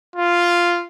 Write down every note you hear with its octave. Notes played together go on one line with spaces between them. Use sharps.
F4